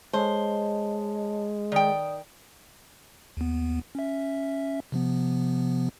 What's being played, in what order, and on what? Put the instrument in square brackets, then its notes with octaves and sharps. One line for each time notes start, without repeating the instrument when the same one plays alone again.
[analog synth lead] G#3 [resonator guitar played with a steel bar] C5 [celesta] C#5 D#5 A5
[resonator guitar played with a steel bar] D#3 G5 [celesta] D5 D#6
[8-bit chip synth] D#2 B3
C#4 E5
C3 F3 B3